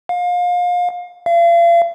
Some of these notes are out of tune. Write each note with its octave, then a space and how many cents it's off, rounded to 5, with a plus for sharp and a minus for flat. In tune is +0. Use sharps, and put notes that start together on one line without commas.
F5 +30
F5 -40